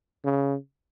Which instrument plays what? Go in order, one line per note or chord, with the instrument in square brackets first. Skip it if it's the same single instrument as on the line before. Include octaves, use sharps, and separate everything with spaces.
[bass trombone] C#3